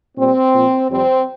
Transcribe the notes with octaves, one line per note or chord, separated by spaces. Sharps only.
A#2 G3 C4
A#2 F3
F2 C3 G3 C4